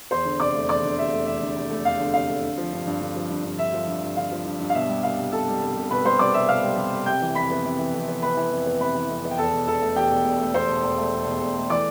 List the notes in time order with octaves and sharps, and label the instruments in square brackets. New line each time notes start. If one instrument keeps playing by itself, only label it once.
[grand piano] E2 C5 C6
D3
F1 D5 D6
A3
E2 D5 D6
D3
F1 E5
A3
E2 E5
D3
F1
A3
E2 F5
D3
F1 F5
A3
D3
F3
G2
G2
D3
F3
G2
G2
D3 E5
F3
G2
G2
D3 F5
F3
G2
G2
F5
B2 E5
G3
C2 F5
C2
B2 A4 A5
G3
C2
C2
B2 B4 B5
G3 C5 C6
C2 D5 D6
C2 E5 E6
B2 F5 F6
G3
C2
C2
C3 G5 G6
E3
F2 B5 B6
B3
C3
E3
F2
B3
C3 B4 B5
E3
F2
B3
C3 B4 B5
E3
F2
B3
G5
E2 A4 A5
B2
E1 A4 A5
A3
E2 G4 G5
B2
E1
A3
E2 C5 C6
B2
E1
A3
E2
B2
E1
A3
E3 D5 D6